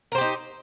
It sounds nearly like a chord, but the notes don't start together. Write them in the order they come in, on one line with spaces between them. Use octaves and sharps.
A#4 C5 G4 D#4